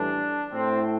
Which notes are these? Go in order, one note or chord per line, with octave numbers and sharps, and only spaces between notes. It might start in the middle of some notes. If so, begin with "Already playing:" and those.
Already playing: A2 E3 G3 D4
A2 A3 C4